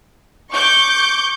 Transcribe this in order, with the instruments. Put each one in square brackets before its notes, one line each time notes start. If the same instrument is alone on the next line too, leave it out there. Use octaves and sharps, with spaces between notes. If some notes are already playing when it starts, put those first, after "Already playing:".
[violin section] C#6 D6 G6 C#7